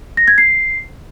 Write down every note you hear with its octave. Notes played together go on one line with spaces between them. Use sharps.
A#6
G#6
C7